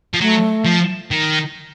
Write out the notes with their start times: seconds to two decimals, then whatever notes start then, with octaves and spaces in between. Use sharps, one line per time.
0.14 F3
0.21 F#3 A3
0.65 F3
1.11 D#3